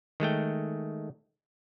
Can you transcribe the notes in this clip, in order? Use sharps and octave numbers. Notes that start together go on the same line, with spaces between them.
D#3 G#3 A3 G5